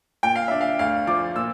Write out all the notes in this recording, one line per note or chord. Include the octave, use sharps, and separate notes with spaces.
A#2 G5
F5
D4 E5
F5
D2 F5
F3 D6
A#2 E6